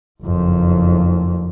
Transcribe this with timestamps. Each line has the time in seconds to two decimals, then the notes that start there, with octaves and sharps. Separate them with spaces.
0.23 F#1 F2